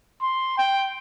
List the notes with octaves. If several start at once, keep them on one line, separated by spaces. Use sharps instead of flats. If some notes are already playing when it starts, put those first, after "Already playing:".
C6
G5